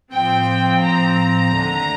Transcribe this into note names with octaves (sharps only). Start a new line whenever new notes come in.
A2 F3 C4 G5
A#5
D#2 D3 A3